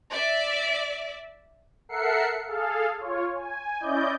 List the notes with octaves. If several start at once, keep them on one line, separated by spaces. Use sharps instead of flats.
D5 E5
A4 A#4 E5 F#5 C7 C#7
G#4 A4 F5
F4 C#5
G#5
C#4 E4 D5 D#5 G6